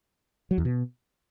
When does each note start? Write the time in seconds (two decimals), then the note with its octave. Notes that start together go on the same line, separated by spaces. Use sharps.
0.51 F#3
0.58 E2
0.65 B2